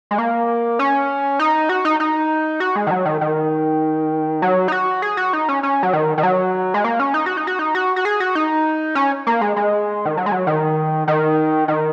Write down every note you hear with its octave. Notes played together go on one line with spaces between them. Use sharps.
G#3
A#3
C#4
D#4
F#4
D#4
D#4
F#4
G#3
D#3
F#3
D#3
D#3
F#3
D#4
F#4
G#4
F#4
D#4
C#4
C#4
F#3
D#3
D#3
F#3
G#3
A#3
C#4
D#4
F#4
D#4
F#4
D#4
F#4
F#4
G#4
F#4
D#4
C#4
A#3
G#3
G#3
D#3
F#3
G#3
F#3
D#3
D#3
D#3